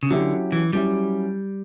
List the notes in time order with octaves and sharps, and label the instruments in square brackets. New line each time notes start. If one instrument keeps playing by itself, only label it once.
[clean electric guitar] C#3
[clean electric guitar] D3 [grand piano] F#3 C#4 E4 G4
[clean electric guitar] E3
[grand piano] F#3 C#4 E4 G4 [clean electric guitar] G3